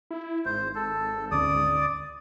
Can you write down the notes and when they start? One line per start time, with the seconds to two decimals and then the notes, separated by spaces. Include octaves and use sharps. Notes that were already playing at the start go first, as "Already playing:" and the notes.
0.11 E4
0.45 G#1 C5
0.75 A4
1.31 D2 C#4 D5 D#6